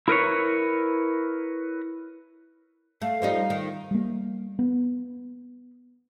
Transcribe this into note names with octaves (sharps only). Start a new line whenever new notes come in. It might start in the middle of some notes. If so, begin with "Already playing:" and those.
E4 A#4 B4 C#5
A3 F5
F3 G3 D#4
D#3
G3 A#3
B3